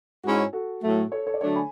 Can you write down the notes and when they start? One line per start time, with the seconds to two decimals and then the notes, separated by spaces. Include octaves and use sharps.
0.24 G#2 G#3 C#4 E4 F#4
0.53 F#4 A4
0.83 A2 F#3 A3
1.12 A4 C#5
1.27 A4 C#5
1.34 D5
1.41 D3 F#3 A3 D4 A4 C#5
1.56 G#5 B5